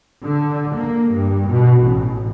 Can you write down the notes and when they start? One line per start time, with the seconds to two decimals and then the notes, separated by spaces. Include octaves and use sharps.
0.23 D3
0.77 A#3
1.11 G2
1.52 B2
1.84 A1